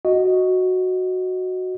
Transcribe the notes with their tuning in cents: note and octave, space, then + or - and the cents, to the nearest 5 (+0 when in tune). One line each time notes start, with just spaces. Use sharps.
F#4 +0 D#5 +5